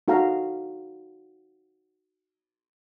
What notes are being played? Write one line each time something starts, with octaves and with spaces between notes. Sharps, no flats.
D#4 F#4 A4 F5 A#5